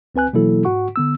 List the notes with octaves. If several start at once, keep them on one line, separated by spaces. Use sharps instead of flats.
C#2 C4 B4 G#5 F#6
B2 E3 F#3 A#3 E4 A4
G#2 F#4 F#5 C#6
D3 B3 E6